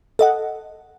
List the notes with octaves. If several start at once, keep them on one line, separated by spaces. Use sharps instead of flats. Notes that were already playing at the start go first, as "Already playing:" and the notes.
A4 D#5 F#5